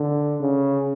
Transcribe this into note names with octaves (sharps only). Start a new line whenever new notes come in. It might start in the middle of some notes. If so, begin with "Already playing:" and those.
Already playing: D3
C#3